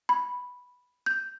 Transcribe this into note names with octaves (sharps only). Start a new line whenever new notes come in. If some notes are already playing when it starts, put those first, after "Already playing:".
B5
G6